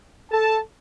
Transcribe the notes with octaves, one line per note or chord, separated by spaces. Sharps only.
A4 A5